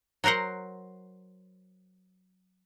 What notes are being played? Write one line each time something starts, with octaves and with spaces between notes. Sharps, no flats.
F#3 F#4 A#4 C5 F#5